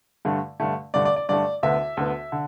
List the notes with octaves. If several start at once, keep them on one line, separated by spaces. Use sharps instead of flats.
G2 D3 A3
G2 D3 A3
G2 D3 A3 D5
D5
D5
G2 D3 A3 D5
D2 D3 B3 E5
D2 D3 B3
D3